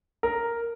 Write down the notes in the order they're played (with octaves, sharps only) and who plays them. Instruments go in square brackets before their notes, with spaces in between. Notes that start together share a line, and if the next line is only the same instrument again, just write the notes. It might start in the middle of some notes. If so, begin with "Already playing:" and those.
[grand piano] A#4